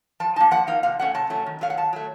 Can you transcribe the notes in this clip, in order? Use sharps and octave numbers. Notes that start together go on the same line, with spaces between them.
F3 A5
A#3 D#4 A5
F3 F#5
A#3 D#4 F5
C3 F5
F#3 A3 C#4 F#5
C3 A5
F#3 A3 C#4
D#3
F#3 A3 F5
F#5
D#3 A5
F#3 A3